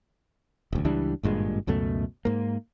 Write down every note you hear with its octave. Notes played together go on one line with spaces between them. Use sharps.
D#1 D2
C#2 E3 G3 D4
G#1 G2 A#2 G#3
C#2 F#2 B2 A3
G#2 A#3